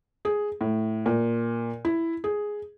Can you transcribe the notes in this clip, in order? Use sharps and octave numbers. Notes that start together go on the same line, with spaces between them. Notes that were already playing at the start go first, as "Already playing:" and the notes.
G#4
A2
A#2
E4
G#4